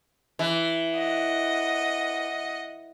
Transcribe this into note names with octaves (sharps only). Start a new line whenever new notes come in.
E3
D#5 F#5